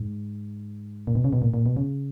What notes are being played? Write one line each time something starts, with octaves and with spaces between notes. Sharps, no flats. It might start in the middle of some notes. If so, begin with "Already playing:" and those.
Already playing: G#2
A#2
B2
C#3
B2
A#2
A#2
B2
C#3